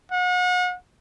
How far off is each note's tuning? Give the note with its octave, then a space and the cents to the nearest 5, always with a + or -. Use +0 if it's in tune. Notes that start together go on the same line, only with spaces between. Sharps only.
F#5 -40